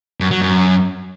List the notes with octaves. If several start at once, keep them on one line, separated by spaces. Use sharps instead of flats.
F#2
F#3
F#2